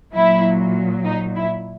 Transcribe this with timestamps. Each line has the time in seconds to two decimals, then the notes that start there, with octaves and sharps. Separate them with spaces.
0.13 A#2 F#3 E4
1.05 D#4
1.36 E4